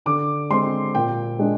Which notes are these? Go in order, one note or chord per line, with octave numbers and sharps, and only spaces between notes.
D3 D6
G#3 C4 C6
A#2 G5
G#3 D4